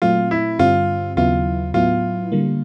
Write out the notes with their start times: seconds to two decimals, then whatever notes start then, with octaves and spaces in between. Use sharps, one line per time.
0.02 A#2 F#3 A3 C4 F4
0.31 E4
0.59 G2 D3 G3 C4 F4
1.17 D#2 C#3 F#3 B3 E4 F4
1.74 A2 F#3 B3 E4 F4
2.32 D3 G3 A#3